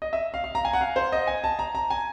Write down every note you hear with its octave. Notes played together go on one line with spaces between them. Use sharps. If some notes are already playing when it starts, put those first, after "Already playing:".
D#5
E5
F5
F5
A#5
G#5
F#5
F5
C5
D#5
G#5
A5
A#5
A#5
G#5